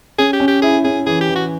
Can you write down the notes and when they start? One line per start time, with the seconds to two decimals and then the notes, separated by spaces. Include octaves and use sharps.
0.18 C#4 G#4
0.33 G4
0.40 C#4
0.48 G4
0.62 E4 G#4
0.84 C#4 G#4
1.06 E3 G#4
1.21 G4
1.29 E3
1.35 F#4